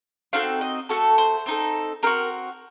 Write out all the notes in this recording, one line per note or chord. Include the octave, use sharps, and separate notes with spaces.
C4 D#4 F#4 A4 F5
D#5
A3 C#4 F#4 A4
C5
C4 D#4 A4
C4 D#4 F#4 A#4